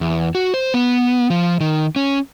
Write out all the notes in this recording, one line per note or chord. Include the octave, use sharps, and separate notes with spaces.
E2
F#4
C5
B3
F3
D#3
C#4